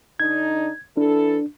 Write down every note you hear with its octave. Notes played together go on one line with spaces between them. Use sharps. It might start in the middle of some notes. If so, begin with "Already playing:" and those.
D3 D4 D#4 G#6
E3 D4 E4 A4